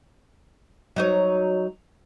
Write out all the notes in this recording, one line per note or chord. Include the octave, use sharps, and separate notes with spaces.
F#3 D#4 C#5